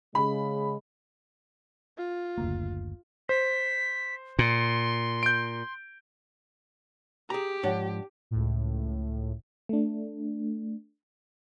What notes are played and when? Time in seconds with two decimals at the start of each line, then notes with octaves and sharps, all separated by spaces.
0.15 C#3 G#3 B5
1.98 F4
2.38 F#1 D2 A#3
3.29 C5 B6
4.39 A#2 C6
5.23 G6 D7
7.30 G4 G#4 A#5
7.63 G#2 F3 D4 C#5 F#5
8.31 C#2 A2
9.69 A3 D4